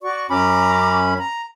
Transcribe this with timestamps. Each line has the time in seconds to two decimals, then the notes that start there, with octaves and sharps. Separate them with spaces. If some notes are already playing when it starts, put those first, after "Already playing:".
0.02 F#4 D5 C#6
0.30 F#2 C#4 A#5 B5 D6
1.16 A#5